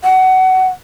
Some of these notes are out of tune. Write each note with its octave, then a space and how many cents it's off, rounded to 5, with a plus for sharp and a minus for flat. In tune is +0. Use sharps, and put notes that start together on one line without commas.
F#5 +20